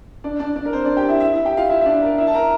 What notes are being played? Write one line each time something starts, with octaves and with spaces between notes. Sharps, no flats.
D4 D5
D4 D5
D4 D5
A#4
C4 C5
D4 D5
G4 G5
E4 E5
E4 E5
E4 E5
G4 G5
F4 F5
E4 E5
E5
D4 D5
A#4
E4 E5
A5
A#4 A#5